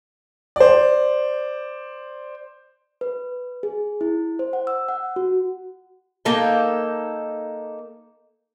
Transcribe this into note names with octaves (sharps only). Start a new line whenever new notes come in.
C5 D5
B4
G#4
E4
C5
F#5
E6
F#5
F#4
A#3 D#4 A4 G5